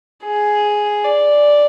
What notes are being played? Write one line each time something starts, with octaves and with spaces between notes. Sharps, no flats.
G#4
D5